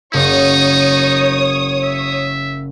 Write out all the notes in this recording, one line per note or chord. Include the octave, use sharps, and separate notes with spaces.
F#1 D#4 C#5 D#6
E5